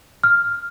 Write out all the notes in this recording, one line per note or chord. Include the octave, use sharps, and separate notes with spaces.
F6